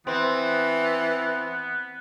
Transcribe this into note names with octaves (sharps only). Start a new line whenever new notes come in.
E3 B3 C4